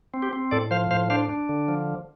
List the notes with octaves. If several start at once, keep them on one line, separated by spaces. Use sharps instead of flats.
C4
G4
C4
A2 A4 D5
F3 C5 F5
A2 C5 F5
D4 C5 F5
D4
D3
F3